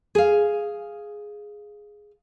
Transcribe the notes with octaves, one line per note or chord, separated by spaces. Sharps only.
G#4 F5